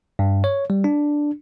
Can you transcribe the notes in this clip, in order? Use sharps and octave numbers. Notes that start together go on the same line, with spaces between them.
G2
C#5
G3
D4